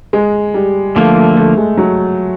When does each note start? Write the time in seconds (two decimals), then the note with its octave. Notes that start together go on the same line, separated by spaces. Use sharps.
0.13 G#3
0.54 G3
0.96 D3 F3 A3 A#3
1.16 A3
1.37 A3
1.57 G#3
1.77 F#3